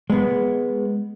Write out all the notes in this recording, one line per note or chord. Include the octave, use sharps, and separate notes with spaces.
G#3 B3